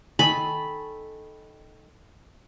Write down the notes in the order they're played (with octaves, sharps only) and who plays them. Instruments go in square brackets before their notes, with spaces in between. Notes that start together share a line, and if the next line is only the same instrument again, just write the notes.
[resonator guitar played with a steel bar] D#3 A4 G#5 [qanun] B5